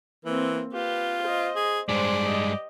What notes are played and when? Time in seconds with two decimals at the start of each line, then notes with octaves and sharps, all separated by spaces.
0.25 E3 A#3 C4
0.73 F4 G4 B4
1.23 C5 D#5
1.56 G#4
1.89 G2 G#3 C5 D5
2.25 G4 D#5